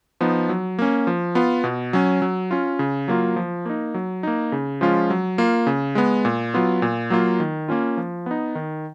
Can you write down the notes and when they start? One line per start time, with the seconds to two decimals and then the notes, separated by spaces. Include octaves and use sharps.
0.21 F3 B3 D#4
0.49 F#3
0.79 A#3 C#4
1.07 F3
1.35 B3 F4
1.64 B2
1.93 F#3 C#4
2.22 F#3
2.51 C#4 F4
2.79 C#3
3.08 F#3 A#3 F4
3.36 F3
3.66 A#3 D#4
3.94 F#3
4.23 A#3 D#4
4.52 C#3
4.81 F3 G#3 C#4 F4
5.10 F#3
5.38 A#3 F4
5.67 C#3
5.95 G#3 B3
6.25 A#2
6.54 F#3 B3 F4
6.82 A#2
7.10 F#3 A#3 F4
7.40 D#3
7.68 A#3 C#4 F4
7.97 F3
8.26 B3 D#4
8.55 D#3